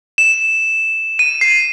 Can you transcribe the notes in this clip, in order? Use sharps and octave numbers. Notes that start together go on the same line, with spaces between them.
E7
D#7
C7